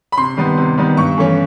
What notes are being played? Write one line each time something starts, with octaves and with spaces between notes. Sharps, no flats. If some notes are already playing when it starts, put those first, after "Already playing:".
B5
C3 C6
D#3 G3 B3
C3
D#3 G3 B3
G2 C#6
E3 A3 C#4